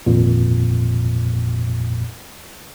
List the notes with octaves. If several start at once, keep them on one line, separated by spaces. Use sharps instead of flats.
G#1 F2 A#2